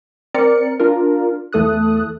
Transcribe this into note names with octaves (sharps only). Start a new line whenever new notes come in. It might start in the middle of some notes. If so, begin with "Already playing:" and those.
C4 A#4 D5 C#7
D4 F4 A#4
E2 A3 A4 D#6 F#6